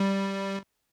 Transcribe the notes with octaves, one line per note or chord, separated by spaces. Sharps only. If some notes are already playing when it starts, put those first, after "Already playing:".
Already playing: G3